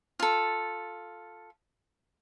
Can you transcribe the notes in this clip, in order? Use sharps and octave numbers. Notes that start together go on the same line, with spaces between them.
F4 A4